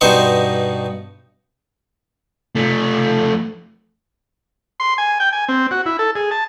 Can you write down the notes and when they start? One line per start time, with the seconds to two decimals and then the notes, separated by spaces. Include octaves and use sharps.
0.01 G2 B2 D#4 C5 C6 C#6
2.56 F3 A3
4.80 C6
4.98 G#5
5.20 G5
5.33 G#5
5.49 C4
5.71 F#4
5.86 E4
5.99 A4
6.15 G#4
6.31 A5